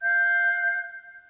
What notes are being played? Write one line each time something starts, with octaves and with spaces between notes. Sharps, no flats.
F5 F#6 G6